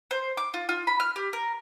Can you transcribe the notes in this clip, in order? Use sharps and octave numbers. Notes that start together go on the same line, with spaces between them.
C5
D6
F4
F4
B5
F6
G4
A#4